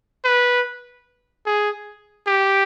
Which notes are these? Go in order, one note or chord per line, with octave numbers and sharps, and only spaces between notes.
B4
G#4
G4